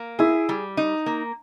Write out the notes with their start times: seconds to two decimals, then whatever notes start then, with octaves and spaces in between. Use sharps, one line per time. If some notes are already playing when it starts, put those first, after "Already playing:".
Already playing: A#3
0.19 E4 G#4
0.49 G3
0.77 D#4
1.06 A#3